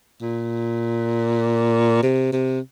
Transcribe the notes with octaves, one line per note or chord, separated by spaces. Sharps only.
A#2
C3
C3